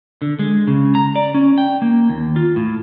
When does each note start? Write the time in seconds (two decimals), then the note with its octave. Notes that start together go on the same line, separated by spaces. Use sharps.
0.22 D3
0.39 G#3
0.67 C#3
0.95 A#5
1.16 D5
1.34 C#4
1.58 G5
1.82 A#3
2.09 D#2
2.36 F4
2.56 A2